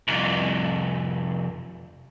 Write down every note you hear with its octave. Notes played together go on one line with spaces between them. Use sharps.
C2 F2